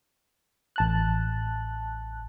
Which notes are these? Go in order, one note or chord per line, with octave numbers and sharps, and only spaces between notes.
A1 A5 F#6